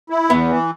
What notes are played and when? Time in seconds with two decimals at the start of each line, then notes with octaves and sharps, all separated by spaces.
0.10 E4
0.29 E2 B3
0.48 E3